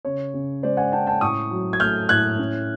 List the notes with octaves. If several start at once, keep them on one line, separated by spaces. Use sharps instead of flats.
C#3 C#5
C#3
G#3 C5 D5
F#5 G#5
C#4 G5 A5
G5 A5
A2 C#6 D#6
F#3
G#6
A3 F6 G6
A2 F#6 G#6
C#4